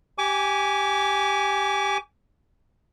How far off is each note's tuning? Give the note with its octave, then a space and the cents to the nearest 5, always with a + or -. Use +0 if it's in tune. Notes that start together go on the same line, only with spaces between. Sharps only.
G4 +0 G#5 +0 D6 -35